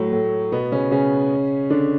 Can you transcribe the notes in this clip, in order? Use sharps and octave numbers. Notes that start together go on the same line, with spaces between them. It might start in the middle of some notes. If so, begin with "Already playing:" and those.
Already playing: A2 F#3 A3
A2 A3
B2 B3
C#3 C#4
C#3 C#4
D3 D4